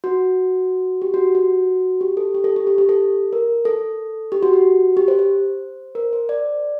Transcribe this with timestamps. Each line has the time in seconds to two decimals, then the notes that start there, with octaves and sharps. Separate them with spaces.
0.04 F#4
1.02 G4
1.14 F#4
1.35 F#4
2.01 G4
2.17 A4
2.34 G4
2.44 A4
2.56 G4
2.67 G4
2.78 G4
2.89 A4
3.33 A#4
3.65 A4
4.32 G4
4.43 F#4
4.53 F#4
4.97 G4
5.08 C5
5.19 C5
5.95 A#4
6.13 C5
6.29 D5